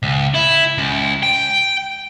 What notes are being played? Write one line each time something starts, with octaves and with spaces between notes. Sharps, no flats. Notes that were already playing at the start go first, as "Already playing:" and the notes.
C#2
E4
C#2
G5